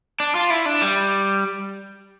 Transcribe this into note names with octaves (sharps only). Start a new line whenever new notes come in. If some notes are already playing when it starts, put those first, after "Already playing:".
D4
F4
E4
D4
G3